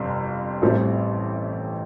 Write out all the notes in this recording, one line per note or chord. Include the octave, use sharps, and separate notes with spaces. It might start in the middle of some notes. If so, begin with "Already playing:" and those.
Already playing: G1 F2 C3 G3
A1 A2 G3 C4